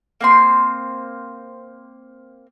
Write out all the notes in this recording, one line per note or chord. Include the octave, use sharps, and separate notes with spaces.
A#3 C4 C6